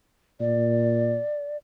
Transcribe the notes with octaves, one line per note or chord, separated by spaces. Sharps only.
A#2 D5